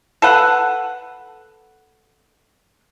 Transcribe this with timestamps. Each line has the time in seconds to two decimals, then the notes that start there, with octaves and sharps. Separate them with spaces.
0.22 A4 B4 F#5